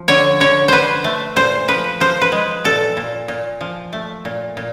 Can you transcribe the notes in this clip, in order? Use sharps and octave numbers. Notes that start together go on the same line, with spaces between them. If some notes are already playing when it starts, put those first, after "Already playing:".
Already playing: F3
D3 C#5
D3 C#5
D3 B4 C5
A3
A#2 C5
F3 B4
F3 C5
B4
G#3
A#2 A4
A#2
A#2
F3
A3
A#2
A#2